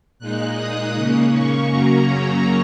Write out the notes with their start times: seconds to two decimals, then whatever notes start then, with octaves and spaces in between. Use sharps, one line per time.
0.19 A#2 G#3 D#4 F#6
0.56 D#6
0.94 C#3 A#3 C#4
1.32 C#6
1.69 F#2 C#3 F#3 A#3 C#4 A#5
2.07 C#5